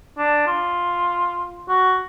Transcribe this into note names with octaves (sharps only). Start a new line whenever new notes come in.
D4
F4
F#4